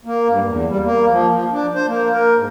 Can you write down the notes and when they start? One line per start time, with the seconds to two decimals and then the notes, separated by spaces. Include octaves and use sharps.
0.05 A#3
0.28 G2
0.45 E2
0.69 G3
0.84 A#3
1.10 F3
1.32 F3
1.52 D4
1.75 C5
1.88 A#3
2.13 A#4
2.36 G#2